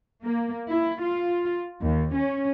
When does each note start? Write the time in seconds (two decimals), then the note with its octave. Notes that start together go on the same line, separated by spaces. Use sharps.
0.24 A#3
0.70 E4
1.01 F4
1.81 D#2
2.15 C#4